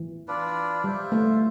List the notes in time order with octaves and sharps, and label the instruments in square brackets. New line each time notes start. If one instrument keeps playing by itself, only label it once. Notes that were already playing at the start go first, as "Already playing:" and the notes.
Already playing: [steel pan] E3
[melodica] D4 F4 B4 D5
[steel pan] G3 [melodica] F4 C5 E5
[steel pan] A3